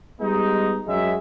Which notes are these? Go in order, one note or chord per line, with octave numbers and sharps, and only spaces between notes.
G3 G#3 B3 D#4
F#2 F#3 G#3 E5